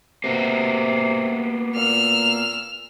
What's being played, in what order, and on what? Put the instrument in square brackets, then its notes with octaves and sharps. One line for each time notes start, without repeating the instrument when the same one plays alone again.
[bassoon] C3 [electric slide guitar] A#3 B3 F#4
[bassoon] A#2 [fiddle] E6 F6